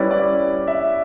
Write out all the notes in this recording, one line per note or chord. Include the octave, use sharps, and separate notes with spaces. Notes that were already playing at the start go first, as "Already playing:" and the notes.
Already playing: G3 C#4 E4 B4 D5
D5
E5